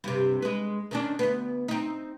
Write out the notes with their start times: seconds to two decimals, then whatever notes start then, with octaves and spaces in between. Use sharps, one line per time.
0.04 G2 C3
0.42 G#3 B4
0.91 D#3 C#4 D4
1.19 D2 B3
1.68 C4 D#4